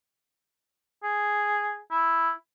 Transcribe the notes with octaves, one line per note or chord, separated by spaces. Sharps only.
G#4
E4